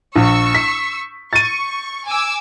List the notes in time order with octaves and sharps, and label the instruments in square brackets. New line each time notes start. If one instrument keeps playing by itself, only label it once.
[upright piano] A#1 [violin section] C#6 E6
[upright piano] B6
[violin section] C#6 [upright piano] A6 D#7
[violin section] G#5 D6 E6